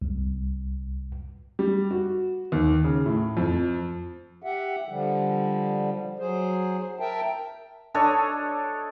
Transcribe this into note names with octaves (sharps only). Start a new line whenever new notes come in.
C2
G3
F#4
D#2
C#3
A2
F2
G4 E5 F#5
D3 F3 G3
F#3 G#4 C5
A#4 E5 G5 A5
D4 A4 C#5 D#5